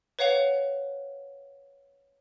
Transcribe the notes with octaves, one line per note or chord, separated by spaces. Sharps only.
B4 C#5 F5 F#5 F7